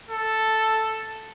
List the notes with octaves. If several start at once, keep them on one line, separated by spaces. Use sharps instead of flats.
A4